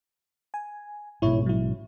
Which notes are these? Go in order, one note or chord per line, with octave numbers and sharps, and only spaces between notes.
G#5
A1 G#2 B2 E4 C#5
F#3 E4